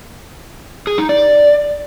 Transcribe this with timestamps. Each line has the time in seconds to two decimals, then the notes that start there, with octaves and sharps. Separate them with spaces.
0.87 G#4
0.98 D#4
1.09 D5